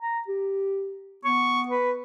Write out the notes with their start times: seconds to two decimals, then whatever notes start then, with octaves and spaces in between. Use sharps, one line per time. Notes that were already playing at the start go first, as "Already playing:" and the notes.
0.01 A#5
0.28 G4
1.25 B3 C#6
1.69 B4